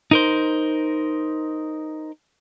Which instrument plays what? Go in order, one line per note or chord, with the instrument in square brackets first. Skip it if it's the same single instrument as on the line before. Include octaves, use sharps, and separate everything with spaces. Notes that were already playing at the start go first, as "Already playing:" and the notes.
[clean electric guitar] D#4 A#4 C5